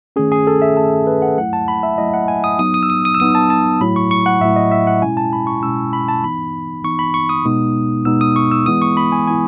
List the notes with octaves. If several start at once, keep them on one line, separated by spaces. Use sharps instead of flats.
D#3 A3 C#4 G#4
G#4
A4
E5
D#3 A3 C#4 A5
B4
F#5
F#3 A3 E4 F#5
A5
B5
E5
F#3 A3 E4 D#5
F#5
G#5
D#6
F#3 B3 D#4 D#6
D#6
E6
D#6
D#6
E6
F#3 B3 D#4 D#6
A5
A5
A2 F#3 A3 E4 B5
C#6
C#6
F#5
A2 F#3 A3 E4 E5
D#5
E5
F#5
B2 G#3 C#4 E4 G#5
A5
B5
C#6
B2 G#3 C#4 E4 E6
B5
A5
E3 B3 D#4 B5
E3 B3 D#4 C#6
B5
C#6
D#6
B2 G#3 B3 D#4
B2 G#3 B3 D#4 E6
D#6
C#6
E6
E3 G#3 B3 E4 D#6
C#6
B5
G#5
E3 G#3 B3 E4 G#5